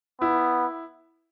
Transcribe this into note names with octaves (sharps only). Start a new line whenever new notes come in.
B3 E4